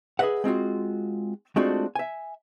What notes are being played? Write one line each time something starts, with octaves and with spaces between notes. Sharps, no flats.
G#4 B4 D#5 E5 F#5
G#3 C4 F4 F#4
G#3 A3 C4 D4 F4 F#4
E5 G#5